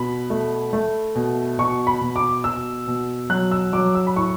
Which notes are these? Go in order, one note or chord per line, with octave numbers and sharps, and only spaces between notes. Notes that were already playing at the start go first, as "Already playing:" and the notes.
Already playing: B2 B5
A3
A3
B2
B2 C#6
B5
B2
D6
B2 E6
B2
F#3 F#6
E6
F#3 D6
E6
B5
A2 C#6